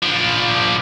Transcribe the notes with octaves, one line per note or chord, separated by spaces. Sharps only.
F3 D4